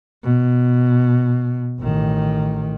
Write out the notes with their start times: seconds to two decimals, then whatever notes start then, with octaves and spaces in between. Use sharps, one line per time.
0.24 B2
1.80 A1 D#3